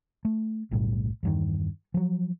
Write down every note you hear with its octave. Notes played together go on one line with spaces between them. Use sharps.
A3
F#1 B1 A2 G3
E2 G2 D#3
F3 F#3